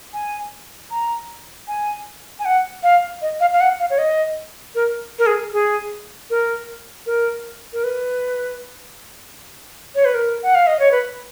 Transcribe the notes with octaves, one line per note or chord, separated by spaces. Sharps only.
G#5
A#5
G#5
G#5
F#5
F5
D#5
F5
F5
F#5
F5
C#5
D#5
A#4
A#4
G#4
G#4
A#4
A#4
A#4
B4
C#5
B4
A#4
F#5
F5
D#5
C#5
B4